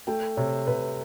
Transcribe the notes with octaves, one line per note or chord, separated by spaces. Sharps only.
A3 G5
C3 C#5
C3 B4